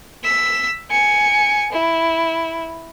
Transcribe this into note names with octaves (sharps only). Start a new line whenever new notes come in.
E6 B6
G#5 C#7
E4